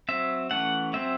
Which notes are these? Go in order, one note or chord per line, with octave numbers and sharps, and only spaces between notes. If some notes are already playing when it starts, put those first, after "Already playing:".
F#3 C4 E5
E3 A3 C#4 F#5
F#3 C4 E5